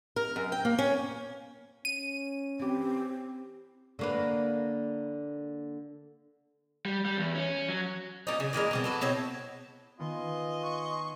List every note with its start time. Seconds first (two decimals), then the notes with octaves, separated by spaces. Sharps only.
0.16 A#4
0.36 F#2
0.52 G5
0.65 A#3
0.79 C#4
1.85 C#4 D#7
2.59 E3 C4 G4
3.99 D3 A#3 B4
6.86 G3
7.05 G3
7.18 E2
7.35 C#4
7.69 F#3
8.27 A#2 G3 C#4 D#4
8.40 C#3
8.53 A#2 E3 G#3 A#4
8.71 B2 G3 C4
8.84 F#4 A4 B4
9.01 B2 C4 E4 C#5
10.00 D#3 B3 F4 D#5 G#5 C6
10.63 F#5 C#6